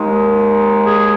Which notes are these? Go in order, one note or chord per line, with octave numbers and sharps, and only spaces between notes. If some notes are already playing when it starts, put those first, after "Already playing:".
Already playing: D#2 D#3 G#3
G#4